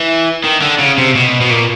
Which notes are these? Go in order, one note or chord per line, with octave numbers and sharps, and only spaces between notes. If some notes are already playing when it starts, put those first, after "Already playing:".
Already playing: E3
D#3
D3
C#3
C3
B2
B2
A#2